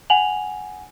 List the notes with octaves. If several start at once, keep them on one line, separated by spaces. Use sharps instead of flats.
F#5 G#5 F7 F#7